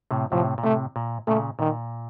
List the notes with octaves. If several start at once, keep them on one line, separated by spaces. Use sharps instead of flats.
A2 C3
A2 C3 F3
A#2
A2 C3 A3
A#2
A#2 C#3 A3
A#2 D#3